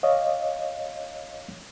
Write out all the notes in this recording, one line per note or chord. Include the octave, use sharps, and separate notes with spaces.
C#5 D#5 F5